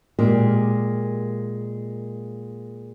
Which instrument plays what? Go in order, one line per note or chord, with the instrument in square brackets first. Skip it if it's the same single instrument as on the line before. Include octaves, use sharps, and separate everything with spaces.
[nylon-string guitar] A#2 G#3 G4 A#4